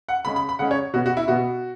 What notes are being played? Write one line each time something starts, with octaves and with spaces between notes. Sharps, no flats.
F#5
C#3 G#3 C#4 B5
B5
B5
C#3 G#3 C#4 F#5
C#5
B2 B3 F#4
F#4
E4
B2 B3 F#4